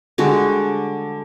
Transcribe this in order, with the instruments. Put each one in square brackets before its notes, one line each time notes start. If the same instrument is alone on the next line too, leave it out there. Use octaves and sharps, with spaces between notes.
[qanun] D3 G3 G#3 F#4